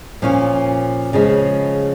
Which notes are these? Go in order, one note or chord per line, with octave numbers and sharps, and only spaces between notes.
A#2 F3 C#4 F4
C#3 F3 G#3